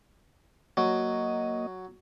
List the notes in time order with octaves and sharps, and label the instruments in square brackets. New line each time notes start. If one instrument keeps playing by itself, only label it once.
[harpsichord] F#3 [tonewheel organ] A#3 D#5